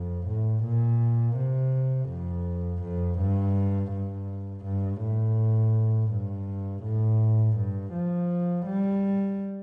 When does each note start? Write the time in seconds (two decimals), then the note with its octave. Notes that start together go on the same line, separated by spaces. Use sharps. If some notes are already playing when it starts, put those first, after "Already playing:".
Already playing: F2
0.27 A2
0.64 A#2
1.37 C3
2.09 F2
2.83 F2
3.19 G2
3.91 G2
4.65 G2
5.02 A2
6.12 G2
6.84 A2
7.57 G2
7.93 F3
8.66 G3